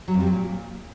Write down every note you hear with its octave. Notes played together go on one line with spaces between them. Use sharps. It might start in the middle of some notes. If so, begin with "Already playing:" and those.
F#3
F2
G3
F#3
A#2